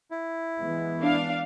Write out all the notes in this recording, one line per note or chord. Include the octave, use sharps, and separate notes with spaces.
E4
E3 G#3 B3
D4 F5